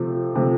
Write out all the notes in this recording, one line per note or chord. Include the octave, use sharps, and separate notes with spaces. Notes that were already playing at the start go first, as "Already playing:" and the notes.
Already playing: C3 F3 A3
C3 F3 A3